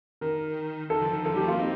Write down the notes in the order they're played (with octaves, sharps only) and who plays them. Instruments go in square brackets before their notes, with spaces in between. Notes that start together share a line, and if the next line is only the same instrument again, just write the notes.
[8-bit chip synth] D#3 [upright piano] A#4
[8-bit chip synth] D#3 [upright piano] A4
[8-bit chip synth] D3 F3
D#3
[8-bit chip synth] D3 F3 [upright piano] A4
[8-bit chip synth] D#3 G3 [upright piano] G4
[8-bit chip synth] F3 A3
[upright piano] F4
[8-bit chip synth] G3 A#3
C4 D#4